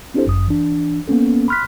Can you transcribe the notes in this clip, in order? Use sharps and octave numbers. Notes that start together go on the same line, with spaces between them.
C4 D4 E4 G4 A4 C5
G1 F#2 D#6
E3 D4
A#3 B3 C#4 A4
B5 C6 F6 F#6 B6